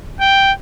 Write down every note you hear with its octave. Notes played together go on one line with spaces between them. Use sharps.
G5